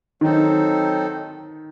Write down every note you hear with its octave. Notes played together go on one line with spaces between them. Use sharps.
D#3 F#3 C4 D#4 A4